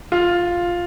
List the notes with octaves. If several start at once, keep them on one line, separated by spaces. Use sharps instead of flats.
F4